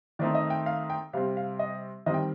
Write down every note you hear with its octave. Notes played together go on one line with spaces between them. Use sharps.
D#3 A3 C4 D#4 D5
D#5
G5
F5
G5
C3 G3 C4 F5
F5
D#5
D#3 G3 C4 D#5
G5